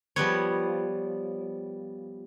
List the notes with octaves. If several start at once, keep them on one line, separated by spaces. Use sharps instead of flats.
F3 G3 B3 C#5